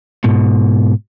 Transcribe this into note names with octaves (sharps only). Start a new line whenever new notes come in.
G#2 B2